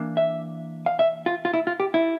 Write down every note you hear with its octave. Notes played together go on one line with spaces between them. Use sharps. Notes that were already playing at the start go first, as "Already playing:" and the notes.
Already playing: E3 A#3 D4
E5
F5
E5
F4
F4
E4
F4
G4
E4